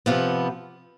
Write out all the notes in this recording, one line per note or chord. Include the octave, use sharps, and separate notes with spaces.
C3 F3 B3